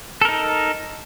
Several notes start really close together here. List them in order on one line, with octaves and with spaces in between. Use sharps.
A4 A#4 D#4